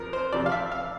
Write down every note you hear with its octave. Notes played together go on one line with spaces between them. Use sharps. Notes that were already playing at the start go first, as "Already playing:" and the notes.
Already playing: F2 F3 A#4
C5
F2 C3 F3 D5
F5
E5
F5